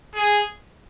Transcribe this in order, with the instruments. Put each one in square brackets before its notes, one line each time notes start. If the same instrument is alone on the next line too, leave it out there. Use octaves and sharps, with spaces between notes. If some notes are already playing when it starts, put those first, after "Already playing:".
[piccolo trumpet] G#4